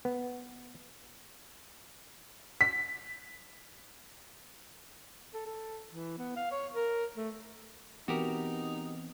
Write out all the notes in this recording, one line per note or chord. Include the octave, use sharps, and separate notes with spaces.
B3
B6
A4
A4
E3
B3
F5
C#5
A#4
A3
E3 B3 C4 D#4 F#4 G4 A#4